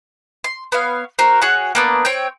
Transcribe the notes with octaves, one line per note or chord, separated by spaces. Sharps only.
C6
B3 C#5 F5
F#4 A#4 C5
F#4 G#4 C#5 F#5
A#3 B3 D4
C4 C#5 G5